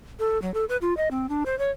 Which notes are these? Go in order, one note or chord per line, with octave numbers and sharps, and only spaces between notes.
A4
F#3
A4
B4
F4
D#5
C4
D4
C5
C#5